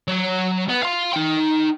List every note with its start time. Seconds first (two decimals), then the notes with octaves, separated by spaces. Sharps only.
0.08 F#3 C#5
0.69 B3
0.83 F5 C6
1.13 D#4 G5